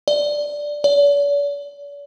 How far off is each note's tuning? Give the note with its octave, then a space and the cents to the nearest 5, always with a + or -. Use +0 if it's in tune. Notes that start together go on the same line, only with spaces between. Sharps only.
D5 +0
D5 -45